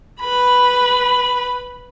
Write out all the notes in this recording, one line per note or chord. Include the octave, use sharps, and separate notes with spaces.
B4 B5